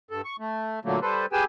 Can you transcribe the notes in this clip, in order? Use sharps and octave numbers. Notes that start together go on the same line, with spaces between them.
G2 A4
C#6
A3
A#2 D3 F#3 A3 A#3
G3 A4 B4 C5
G4 G#4 B4 G5 G#5 E6